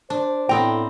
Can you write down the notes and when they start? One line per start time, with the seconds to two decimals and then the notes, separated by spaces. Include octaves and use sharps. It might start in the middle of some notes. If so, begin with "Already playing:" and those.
0.10 D4 C5
0.49 A2 B3 C4 G5 A#5